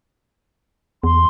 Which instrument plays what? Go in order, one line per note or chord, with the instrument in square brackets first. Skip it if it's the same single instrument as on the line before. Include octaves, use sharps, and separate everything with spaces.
[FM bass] E2 [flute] C6